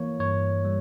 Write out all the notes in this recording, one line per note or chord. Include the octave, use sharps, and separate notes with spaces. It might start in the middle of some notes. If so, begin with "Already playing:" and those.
Already playing: E3 A#3 C#5
G2 C#5
G3